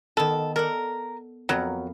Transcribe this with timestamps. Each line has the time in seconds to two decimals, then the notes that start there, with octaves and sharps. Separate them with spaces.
0.17 D#3 B3 A4
0.56 A4 A#4 D5 F#5
1.49 F2 F#3 B3 A#4